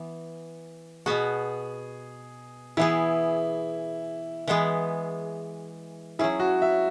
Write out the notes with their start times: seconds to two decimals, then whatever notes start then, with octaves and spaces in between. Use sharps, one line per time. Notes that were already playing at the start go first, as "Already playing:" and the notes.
Already playing: E3 B3
1.06 B2 B3 F#4 G#4
2.77 E3 B3 E4 G#4
4.47 E3 G#3 B3 G#4
6.19 F#3 C#4 E4 G#4
6.40 F#4
6.62 E5